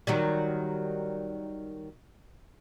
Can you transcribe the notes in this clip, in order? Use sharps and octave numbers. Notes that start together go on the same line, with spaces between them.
D#3 F#3 G3